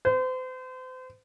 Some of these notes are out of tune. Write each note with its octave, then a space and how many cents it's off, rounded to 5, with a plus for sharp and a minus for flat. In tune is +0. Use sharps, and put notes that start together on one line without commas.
C5 -35